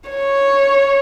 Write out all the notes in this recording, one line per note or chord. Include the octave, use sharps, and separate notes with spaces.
C#5